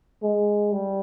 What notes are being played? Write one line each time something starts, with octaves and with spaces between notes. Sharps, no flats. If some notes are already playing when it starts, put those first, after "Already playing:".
G#3
G3